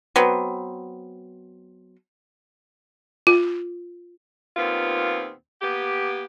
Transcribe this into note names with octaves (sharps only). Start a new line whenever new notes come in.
F#3 B3 C4
F4
D#2 A#2 B3 C4 F4
A#3 B3 G4